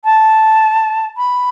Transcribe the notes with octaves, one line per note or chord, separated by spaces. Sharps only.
A5
B5